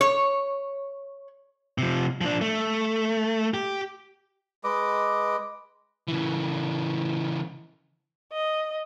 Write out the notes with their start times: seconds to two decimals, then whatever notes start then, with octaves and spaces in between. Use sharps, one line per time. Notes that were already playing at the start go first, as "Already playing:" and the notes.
0.01 C#5
1.78 C3 F3
2.21 F3 D4
2.41 A3
3.54 G4
4.64 G#3 B4 D#5 D6
6.08 C#3 E3
8.33 D#5